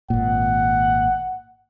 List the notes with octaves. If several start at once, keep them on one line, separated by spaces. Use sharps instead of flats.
G#1 A#2 F#5